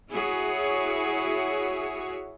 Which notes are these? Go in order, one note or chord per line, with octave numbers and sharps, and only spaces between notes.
E4 F#4 G#4 C#5